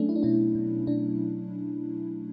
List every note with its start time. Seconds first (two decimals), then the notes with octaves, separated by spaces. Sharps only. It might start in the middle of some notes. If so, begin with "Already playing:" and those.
Already playing: F#3 A3 C#4 D4
0.09 E4
0.16 D4
0.22 B2 C#4 E4
0.55 B2
0.87 B2 D4